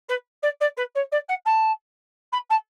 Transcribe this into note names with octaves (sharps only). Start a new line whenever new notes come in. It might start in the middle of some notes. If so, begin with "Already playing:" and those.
B4
D5
D5
B4
C#5
D5
F#5
A5
B5
A5